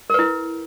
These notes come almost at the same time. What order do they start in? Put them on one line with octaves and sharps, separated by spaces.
A#4 B4 E4